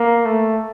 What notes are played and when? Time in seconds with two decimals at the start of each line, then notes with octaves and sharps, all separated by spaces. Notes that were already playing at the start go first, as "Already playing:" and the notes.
Already playing: A#3
0.25 A3